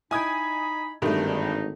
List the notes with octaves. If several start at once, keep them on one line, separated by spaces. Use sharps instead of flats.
D#4 E4 G5 G#5 B5 D#6 G#6
G#1 G2 D3 D#3 A3 D4 D#4